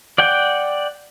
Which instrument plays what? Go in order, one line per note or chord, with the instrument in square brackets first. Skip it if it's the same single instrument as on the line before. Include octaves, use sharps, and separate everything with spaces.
[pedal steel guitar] D5 F#5 G5